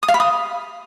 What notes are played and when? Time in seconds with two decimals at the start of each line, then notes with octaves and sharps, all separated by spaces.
0.03 D#6
0.08 F5
0.14 B5
0.20 D#6